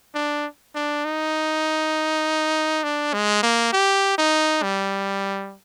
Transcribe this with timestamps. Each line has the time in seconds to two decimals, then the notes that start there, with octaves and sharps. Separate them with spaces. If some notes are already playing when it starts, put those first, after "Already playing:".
0.15 D4
0.75 D4
1.05 D#4
2.84 D4
3.14 G#3
3.43 A#3
3.73 G4
4.18 D#4
4.63 G3